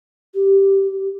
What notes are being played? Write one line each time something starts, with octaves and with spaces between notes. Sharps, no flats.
G4